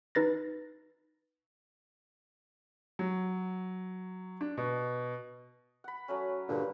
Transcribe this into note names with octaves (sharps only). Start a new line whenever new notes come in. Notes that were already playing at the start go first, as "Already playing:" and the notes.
D#4 B4 A6 A#6
F#3
D4
B2
F#5 B5
F#3 A3 C#4
G2 A#2 D3